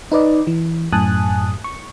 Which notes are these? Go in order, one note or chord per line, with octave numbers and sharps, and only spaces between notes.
D#4 B4 D5 D#5
E3
F#2 A2 G#5 A5 D#6 F#6
C#6